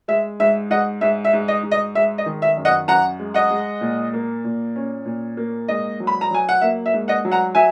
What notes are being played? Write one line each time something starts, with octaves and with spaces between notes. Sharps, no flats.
G#3 E5
G#2 E5
G#2 D#5 F#5
G#2 E5
E5
G#2
D#5
G#2
D#5
G#3 E5
D#5
D#3
E5
F#2
D#5 F#5
F#2 F#5 A#5
G#3
D#5 F#5
G#3
A#2
A#3
A#2
C#4
A#2
A#3
G#2 D#5
F#3
B5
A#5
F#3 G#5
F#5
A#3 E5
E5
G#2
D#5 F#5
F#3
F#5 A#5
F#3 E5 G#5